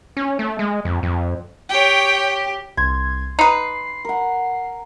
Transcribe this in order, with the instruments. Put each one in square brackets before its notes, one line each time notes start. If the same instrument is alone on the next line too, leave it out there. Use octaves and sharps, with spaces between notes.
[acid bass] C#4
A3
G#3
F2
F2
[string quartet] G4 [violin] C#5 G5
[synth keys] C2 G#6 [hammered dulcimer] C6
[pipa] D#4 B4 [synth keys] C7
[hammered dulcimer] A#4 F#5